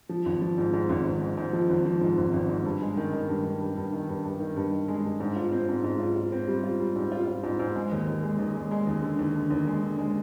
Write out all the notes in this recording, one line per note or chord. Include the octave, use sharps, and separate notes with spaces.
F3
G#1
F3
G#2
G#2
G#1
G#1
G#2
G#2
F3
G#1
F3
G#2
G#1
G#1
G#2
G2
G#3
D#3
D#3
G2
G2
G2
G2
D#3
G2
G2
D#3
G2
D#3
G#3
G2
G#2
F4
C4
G#2
G#2
F4
F4
C4
G3
F4
G3
G#2
F4
F4
G#2
G#2
G#3
D#2
D#2
G#3
D#2
G#3
G#3
D#2
D3
D#2
D3
D#2
G#3
D3
G#3